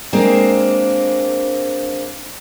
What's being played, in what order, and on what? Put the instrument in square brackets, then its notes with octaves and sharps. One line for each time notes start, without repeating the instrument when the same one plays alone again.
[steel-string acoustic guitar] G#3 A#3 C4 D4